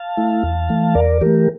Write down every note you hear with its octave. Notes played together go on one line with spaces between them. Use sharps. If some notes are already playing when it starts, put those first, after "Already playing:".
Already playing: F5 A5
A3 E4
E2
E3 A3
E2 A#4 D5
E3 A3 G4 A#4